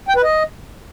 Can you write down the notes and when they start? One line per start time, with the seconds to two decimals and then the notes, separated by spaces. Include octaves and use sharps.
0.09 G5
0.16 B4
0.23 D#5